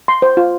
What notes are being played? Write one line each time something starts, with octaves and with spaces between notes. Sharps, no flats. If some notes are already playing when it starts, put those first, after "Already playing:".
C6
C5
F4